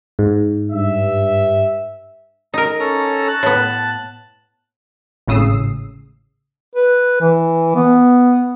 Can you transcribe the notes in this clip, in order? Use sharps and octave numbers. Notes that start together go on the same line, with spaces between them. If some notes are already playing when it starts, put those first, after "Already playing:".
G#2
G2 E5
D#4 A#4 A#5
C#4 A4 A#5
A5 F#6
A2 B3
G#1 A2 C#3 D#6 E6 C7
B4
E3
B3